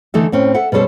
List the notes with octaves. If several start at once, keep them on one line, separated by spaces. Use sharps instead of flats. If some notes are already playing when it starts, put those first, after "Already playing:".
D3 E3 A3 D#4 A4 E5
A2 C4 C#4
A4 E5 F#5
B2 G3 C#4 A4 C5